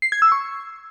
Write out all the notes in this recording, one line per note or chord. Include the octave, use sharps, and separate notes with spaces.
C7
G#6
E6
C#6